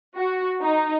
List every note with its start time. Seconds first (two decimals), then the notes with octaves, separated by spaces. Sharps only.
0.16 F#4
0.61 D#4